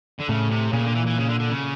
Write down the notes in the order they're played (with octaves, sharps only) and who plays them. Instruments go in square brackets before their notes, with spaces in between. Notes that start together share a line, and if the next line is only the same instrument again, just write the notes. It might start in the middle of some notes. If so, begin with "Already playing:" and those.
[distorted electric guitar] D3
[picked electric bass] A2 [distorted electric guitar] C#3
[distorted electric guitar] C3
[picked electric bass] A#2 [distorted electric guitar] C#3
[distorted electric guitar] D3
E3
E3
C#3
D3
D3
C#3